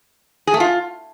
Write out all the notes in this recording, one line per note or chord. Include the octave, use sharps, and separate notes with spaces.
G#4
A3
F4